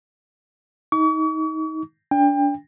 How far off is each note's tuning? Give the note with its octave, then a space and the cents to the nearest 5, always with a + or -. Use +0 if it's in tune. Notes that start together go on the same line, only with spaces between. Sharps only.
D#4 +25 C#6 +40
D4 -25 G5 +30